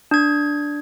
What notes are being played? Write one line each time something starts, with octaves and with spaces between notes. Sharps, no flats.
D4 G#6